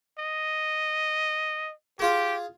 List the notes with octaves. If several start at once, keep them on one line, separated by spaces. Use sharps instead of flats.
D#5
F4 G4 G#4